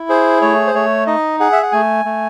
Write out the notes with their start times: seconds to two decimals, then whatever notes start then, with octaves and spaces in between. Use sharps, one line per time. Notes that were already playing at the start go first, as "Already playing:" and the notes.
Already playing: E4
0.09 G#4 C5
0.41 A3 C#5
0.67 C5
0.75 A3 C#5
1.07 D#4 D#5
1.40 G#4 F#5
1.52 E5
1.63 F#5
1.72 A3 G#5
2.05 A3